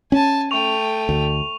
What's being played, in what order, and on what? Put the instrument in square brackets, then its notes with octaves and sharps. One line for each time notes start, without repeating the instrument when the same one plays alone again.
[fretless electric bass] C#4 [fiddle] G#5 A5
[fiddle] A3 G5 [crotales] C#6 F7
[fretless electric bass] D2